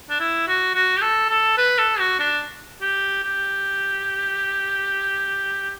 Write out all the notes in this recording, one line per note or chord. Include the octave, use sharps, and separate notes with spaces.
D4
E4
F#4
F#4
G4
A4
A4
B4
A4
F#4
D4
G4
G4